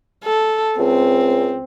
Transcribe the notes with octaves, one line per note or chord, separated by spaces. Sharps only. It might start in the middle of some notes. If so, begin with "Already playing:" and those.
A4
C#2 C4